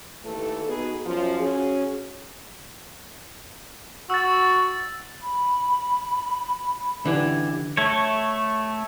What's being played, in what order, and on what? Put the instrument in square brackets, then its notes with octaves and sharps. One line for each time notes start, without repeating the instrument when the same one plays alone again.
[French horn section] D#2 E3 A3 A4
B3 D#4 F#4 G#4 B4
F#2 F3
C#4 F#4 G#4
[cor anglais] F#4 [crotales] E6 A6
[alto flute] B5
[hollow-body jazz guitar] D3 E3 [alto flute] G4
[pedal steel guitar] A3 C#5